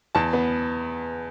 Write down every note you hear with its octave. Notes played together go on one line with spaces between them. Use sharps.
E2 A5
B3